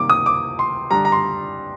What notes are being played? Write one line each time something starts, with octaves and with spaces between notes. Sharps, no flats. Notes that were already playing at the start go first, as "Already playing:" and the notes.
Already playing: C3 D#3 G3 A#3 D6
D#6
D6
C6
D3 G3 D4 A#5
A#5
C6